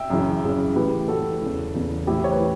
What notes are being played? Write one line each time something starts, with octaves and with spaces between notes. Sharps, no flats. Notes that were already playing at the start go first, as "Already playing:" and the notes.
Already playing: E5 G5
F#2 C#3 E3
F#2 C#3 E3
A2 E3 G4 B4
A2 E3 F#4 A4
E2 C#3 E3
E2 C#3 E3
A2 E3 E4 G4
C#5
B4
E3